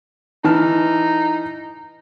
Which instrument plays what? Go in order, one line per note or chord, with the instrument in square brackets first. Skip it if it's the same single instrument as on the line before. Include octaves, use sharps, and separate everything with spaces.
[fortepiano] E3 A5 F6 [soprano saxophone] D#4